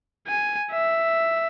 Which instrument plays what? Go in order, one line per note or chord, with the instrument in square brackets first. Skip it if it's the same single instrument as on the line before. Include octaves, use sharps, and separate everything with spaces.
[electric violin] G#5
E5